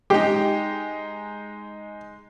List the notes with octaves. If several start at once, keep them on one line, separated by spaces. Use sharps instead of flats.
G#3 D#4 G4